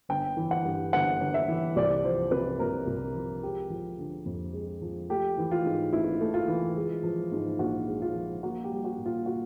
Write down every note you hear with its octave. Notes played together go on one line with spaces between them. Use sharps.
G1 G5
E3
F#5
G2
G1 F#5
G1
E5
E3
C2 D5
F3 C5
C3 B4
C2 A#4
C2
F3
G#3 G4
F3
D3
F2
G#3
F3
A3 G4
E3
F4
G#2
A1 E4
A3
F4
E3
G#3
F3
G#2
A#1 F#4
G#3
F4
F3
A#3 F#4
G4
G3
F#4
A#2
F4
F#4